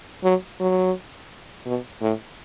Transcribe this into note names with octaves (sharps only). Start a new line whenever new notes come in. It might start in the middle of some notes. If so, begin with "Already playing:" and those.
F#3
F#3
B2
A2